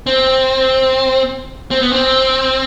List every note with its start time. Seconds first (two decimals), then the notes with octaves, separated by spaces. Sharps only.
0.06 C4
1.71 C4
1.82 B3
1.92 C4